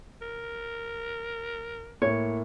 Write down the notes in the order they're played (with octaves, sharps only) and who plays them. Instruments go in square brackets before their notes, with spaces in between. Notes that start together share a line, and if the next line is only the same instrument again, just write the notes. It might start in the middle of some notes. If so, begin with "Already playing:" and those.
[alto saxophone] A#4
[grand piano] A2 A#3 [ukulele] C#5